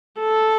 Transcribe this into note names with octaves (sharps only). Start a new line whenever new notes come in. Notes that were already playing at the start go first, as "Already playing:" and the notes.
A4